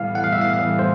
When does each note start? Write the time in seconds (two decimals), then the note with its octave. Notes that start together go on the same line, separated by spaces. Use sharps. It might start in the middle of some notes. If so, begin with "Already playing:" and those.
Already playing: A2 E3 G3 B3 F5
0.15 F#5
0.24 F5
0.33 E5
0.41 F5
0.53 F5
0.79 C5